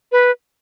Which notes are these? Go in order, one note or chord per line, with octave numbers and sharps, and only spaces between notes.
B4